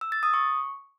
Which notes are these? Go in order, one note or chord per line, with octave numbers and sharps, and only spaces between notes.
E6
A6
D#6
C#6